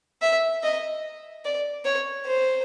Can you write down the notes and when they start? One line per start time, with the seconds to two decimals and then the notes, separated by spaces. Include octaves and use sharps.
0.22 E5
0.63 D#5
1.45 D5
1.85 C#5
2.26 C5